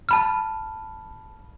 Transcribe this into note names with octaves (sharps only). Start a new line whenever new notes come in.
A5 B5 F6